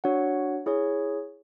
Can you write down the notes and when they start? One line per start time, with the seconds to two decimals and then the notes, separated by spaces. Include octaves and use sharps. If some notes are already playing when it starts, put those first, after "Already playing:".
0.04 D4 F#4 C#5 F#5
0.66 E4 G#4 C#5